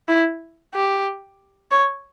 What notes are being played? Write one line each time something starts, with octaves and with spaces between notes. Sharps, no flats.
E4
G4
C#5